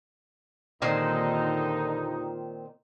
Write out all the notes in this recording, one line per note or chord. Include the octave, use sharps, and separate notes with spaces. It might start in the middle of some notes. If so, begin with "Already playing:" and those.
D#2 A#2 D3 D#3 C4 D#4